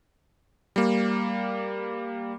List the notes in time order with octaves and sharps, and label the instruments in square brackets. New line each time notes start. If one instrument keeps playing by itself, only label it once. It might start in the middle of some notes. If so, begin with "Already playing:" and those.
[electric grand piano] G3 A#3